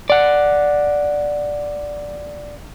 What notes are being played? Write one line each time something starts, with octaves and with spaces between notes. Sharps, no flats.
D5 F#5